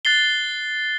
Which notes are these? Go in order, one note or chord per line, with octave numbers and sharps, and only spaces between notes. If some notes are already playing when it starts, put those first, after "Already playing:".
F#6 A6 C7 G7